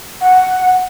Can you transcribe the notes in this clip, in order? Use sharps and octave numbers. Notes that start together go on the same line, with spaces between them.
F#5